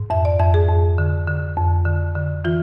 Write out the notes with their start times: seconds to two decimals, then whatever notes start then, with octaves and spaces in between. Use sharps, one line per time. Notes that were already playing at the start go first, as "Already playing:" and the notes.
Already playing: G#2
0.10 F2 E5
0.25 D5
0.39 F2 E5
0.54 G#4
0.68 F2
0.98 D3
1.28 D3
1.57 F2
1.85 D3
2.15 D3
2.44 E3 F4